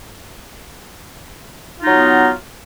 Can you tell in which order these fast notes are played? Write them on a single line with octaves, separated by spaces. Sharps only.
F4 D#4 F#3 B3